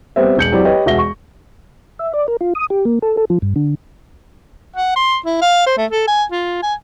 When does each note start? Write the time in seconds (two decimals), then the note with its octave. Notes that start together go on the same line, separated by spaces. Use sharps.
0.16 G3 B3 C4 C5 E5
0.37 E1 G6 C#7 F#7
0.52 F#3 C4 E4 G4 D5
0.65 G4 B4 C#5 D#5 G5
0.86 E1 F#4 E5 A#6 G7
0.98 C#6
1.99 E5
2.14 D5
2.28 A#4
2.41 F4
2.55 D#6
2.70 G4
2.85 A#3
3.02 A4
3.17 A4
3.30 F3
3.42 G2
3.56 D3
4.76 F#5
4.96 C6
5.25 E4
5.41 F5
5.66 C5
5.77 A3
5.90 A4
6.07 G#5
6.32 F4
6.62 G#5